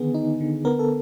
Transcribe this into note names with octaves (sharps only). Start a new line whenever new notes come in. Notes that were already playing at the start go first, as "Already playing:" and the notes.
Already playing: D3 D#3 B3 G#4
D#4
D3
B3 A#4
A4